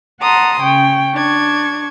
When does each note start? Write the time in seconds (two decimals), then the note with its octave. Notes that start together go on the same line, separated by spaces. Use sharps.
0.21 F#5 A5 A#5 C6 D#6
0.60 C#3 C#5 G5
1.14 D4 C#6 G#6